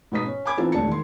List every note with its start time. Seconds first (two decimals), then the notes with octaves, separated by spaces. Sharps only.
0.12 G#2 B2 B3 D#4 D#6 B6
0.26 C#4
0.45 G#5 B5 D6 G#6
0.58 E3 B3 C4 D#4 F4 A4
0.72 E1 D2 D4 A5 C#7
0.88 D#3 C6